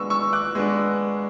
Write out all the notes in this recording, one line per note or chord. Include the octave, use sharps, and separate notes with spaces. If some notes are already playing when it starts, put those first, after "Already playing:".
Already playing: G#3 B3 D4 C#6 E6
C#6 E6
D6 F#6
G#3 B3 D4